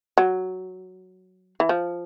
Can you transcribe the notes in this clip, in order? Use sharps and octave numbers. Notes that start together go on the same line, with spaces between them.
F#3
E3
F3